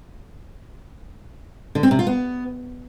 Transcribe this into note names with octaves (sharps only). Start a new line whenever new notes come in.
D3
C4
C3
F4
B3